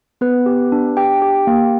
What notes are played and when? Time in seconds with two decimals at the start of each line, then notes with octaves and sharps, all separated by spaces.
0.21 B3 B4
0.46 G4
0.72 D4
0.97 G4 G5
1.22 G4
1.47 A#3